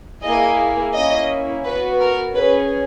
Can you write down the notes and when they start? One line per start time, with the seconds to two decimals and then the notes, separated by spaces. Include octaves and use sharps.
0.22 A#3 E4 G#4 D#5
0.93 A#3 C#4 E4 D#5
1.64 B3 F#4 B4
2.00 A#4
2.35 C#4 G#4 B4